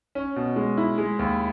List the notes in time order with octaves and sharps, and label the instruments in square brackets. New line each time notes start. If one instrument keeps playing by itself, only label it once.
[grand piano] C#4
B2
G#3
E4
G#3
D#2